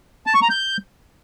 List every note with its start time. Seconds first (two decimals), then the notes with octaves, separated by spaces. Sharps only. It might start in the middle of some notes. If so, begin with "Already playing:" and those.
0.26 A5
0.34 C#6
0.42 A#5
0.50 G6